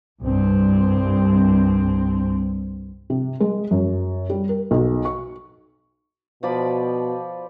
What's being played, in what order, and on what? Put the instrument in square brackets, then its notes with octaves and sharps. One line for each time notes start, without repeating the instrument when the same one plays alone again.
[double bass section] C2 G2 C4
[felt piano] C3
G#3
F#2
G3
A#4
B1
C#6
[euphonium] B2 [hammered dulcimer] F3 D5 B5